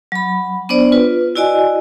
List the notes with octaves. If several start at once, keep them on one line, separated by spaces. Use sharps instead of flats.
F#3 B5
B3 D4 C5 D5
F4 B4
E4 F#4 D5 D#5 G#5